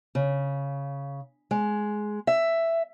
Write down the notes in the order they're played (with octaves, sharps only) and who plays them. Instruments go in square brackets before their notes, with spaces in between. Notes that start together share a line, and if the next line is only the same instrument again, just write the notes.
[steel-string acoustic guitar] C#3
G#3
E5